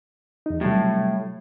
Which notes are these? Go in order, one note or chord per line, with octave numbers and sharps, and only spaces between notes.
E2 D#4
A2 C3 F#3 G3